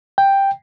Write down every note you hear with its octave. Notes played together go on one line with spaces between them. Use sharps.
G5